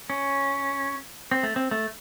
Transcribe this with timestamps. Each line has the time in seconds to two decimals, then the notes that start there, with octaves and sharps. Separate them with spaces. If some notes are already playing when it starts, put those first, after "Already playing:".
0.10 C#4
1.31 C4
1.43 A3
1.56 C4
1.71 A3